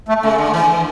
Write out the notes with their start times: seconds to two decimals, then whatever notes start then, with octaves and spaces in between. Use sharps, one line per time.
0.09 A3
0.23 C#3 A3
0.38 D3
0.54 E3